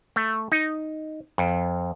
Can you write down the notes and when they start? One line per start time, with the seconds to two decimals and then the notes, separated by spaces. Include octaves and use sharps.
0.16 A3
0.52 D#4
1.38 F2